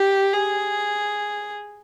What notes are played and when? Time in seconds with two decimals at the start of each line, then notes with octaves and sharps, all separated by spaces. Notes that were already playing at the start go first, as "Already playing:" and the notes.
Already playing: G4
0.33 G#4